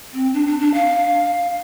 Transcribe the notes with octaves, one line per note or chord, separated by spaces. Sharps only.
C4
D4
D4
D4
F5